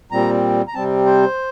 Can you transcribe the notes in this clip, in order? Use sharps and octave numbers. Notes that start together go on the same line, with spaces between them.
A#2 G3 C4 A#5
A#5
C3 G3 C4 A5
C5